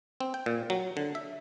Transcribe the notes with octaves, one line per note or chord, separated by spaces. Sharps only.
C4
G5
A#2
F#3
D3
E5